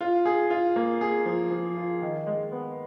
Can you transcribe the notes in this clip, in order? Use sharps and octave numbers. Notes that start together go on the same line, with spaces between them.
F4
G#4
F4
A#3
G#4
F3
F3
F4
D#3
G#3
B3